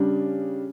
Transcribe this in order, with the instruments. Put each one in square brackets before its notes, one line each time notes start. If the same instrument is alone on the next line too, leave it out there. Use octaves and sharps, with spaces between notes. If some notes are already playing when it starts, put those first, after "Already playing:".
Already playing: [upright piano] C#3 G3 D4